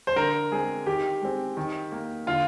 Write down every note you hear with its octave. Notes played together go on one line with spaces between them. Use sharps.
C5
D3 A#4
G#3 C4 G#4
D#3 G4
G#3 C4
D#3
A#3
D3 F4